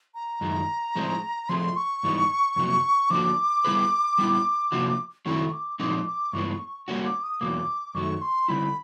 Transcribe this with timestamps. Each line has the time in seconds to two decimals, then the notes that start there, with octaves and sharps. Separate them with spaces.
0.15 A#5
0.41 F#2 D#3 G#3
0.95 A2 F3 G#3 C4
1.49 F3 A3 C4 F4 G#4 C6
1.76 C#6
2.03 G#2 E3 G3 B3 D#4
2.56 F2 C3 F#3 A#3
3.10 D3 F3 A#3 D4 F#4 D6
3.65 G3 B3 E4 G#4 B4
4.18 G3 B3 E4
4.72 C3 F3 A#3 D4 F#4
5.26 D#3 F#3 A3 C4 E4 C#6
5.53 D6
5.80 A#2 F3 G#3 C4 D#4 D6
6.07 D6
6.33 G2 E3 G#3 B3 C#6
6.88 G3 A#3 C#4 F#4
7.05 D6
7.23 D#6
7.41 E2 B2 F#3 A#3 D6
7.95 F#2 D#3 F#3 A3 C#6
8.22 C6
8.48 D3 G3 C4 E4 B5